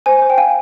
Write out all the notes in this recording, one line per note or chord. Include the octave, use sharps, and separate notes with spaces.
C5 G#5
C5
G5
F5 G#5